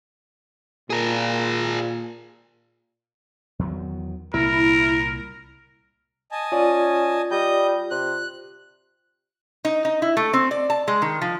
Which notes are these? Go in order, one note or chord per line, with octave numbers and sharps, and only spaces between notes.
A#2 G#4 A#4
E2 D#3 F#3
C2 A#2 E4 A#4
D#5 G#5 A5
C#4 F4 D5
G3 D#5 G6
C3 F#6
D#4
D#4
E4
A3
C4
D5
A5
G#3
D#3
F3